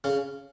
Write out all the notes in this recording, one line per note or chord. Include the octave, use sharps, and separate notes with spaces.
C#3 C#4